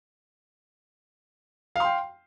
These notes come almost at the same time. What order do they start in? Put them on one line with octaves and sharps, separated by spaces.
F5 C6 G5